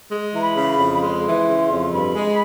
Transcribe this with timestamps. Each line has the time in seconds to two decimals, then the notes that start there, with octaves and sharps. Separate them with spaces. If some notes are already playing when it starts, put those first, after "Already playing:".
0.11 G#3
0.34 E3 A#5
0.41 B5
0.56 C#3
0.71 B5
0.79 F2
0.94 B5
1.02 G#3 C6
1.25 E3
1.48 C#3
1.70 F2
1.92 G2 B5
2.15 G#3